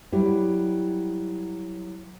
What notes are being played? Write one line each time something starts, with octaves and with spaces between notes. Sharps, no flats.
F#3 G3 E4